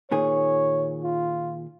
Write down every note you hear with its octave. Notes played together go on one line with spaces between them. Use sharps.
A#2 D#3 G#4 C#5
F4